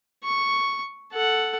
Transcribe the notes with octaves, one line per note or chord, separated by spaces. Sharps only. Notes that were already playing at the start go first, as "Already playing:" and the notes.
C#6
A4 F#5